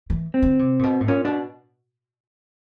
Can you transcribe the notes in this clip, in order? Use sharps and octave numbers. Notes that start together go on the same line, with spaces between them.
E3
C4
D3
C3
A#2
B2
A2
A#2 C#4
B2 D4